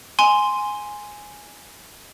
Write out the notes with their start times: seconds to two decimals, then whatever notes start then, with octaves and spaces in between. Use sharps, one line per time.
0.19 G#5 C6